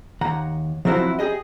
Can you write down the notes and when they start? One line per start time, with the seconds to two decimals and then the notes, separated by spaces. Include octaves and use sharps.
0.21 D#2 F#5 A#5
0.85 F3 F#3 C4 E4 F#4
1.19 G4 G#4 D#5